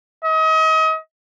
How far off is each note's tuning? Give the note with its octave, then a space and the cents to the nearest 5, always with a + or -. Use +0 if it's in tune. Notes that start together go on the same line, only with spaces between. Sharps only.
D#5 +35